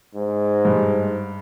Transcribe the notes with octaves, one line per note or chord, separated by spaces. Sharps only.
G#2
G2